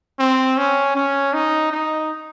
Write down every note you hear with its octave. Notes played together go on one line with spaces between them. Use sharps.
C4
C#4
C#4
D#4
D#4